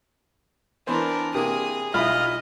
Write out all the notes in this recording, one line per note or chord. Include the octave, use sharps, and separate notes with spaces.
E3 B3 D4 A#4 C5
C3 A#3 G#4 D#6
B1 E4 F4 D#5 B5